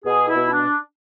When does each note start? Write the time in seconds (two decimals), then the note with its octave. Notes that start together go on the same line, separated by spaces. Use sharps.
0.04 B2 G#4
0.27 E4
0.35 B2
0.50 D4